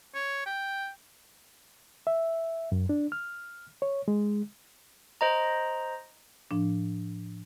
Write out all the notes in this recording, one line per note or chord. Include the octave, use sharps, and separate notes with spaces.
C#5
G5
E5
F#2
D4
F6
C#5
G#3
C5 D#5 A#5
A2 F3 D4